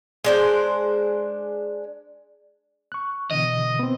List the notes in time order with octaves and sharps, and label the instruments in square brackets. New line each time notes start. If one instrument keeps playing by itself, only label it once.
[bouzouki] G#3 D4 C5
[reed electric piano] C#6 F#6
[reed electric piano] B2 D3 E3 [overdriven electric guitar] D#5
[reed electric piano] B3 C4